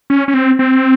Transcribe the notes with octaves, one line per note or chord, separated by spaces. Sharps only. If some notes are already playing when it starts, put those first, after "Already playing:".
C#4
C#4
C4
C4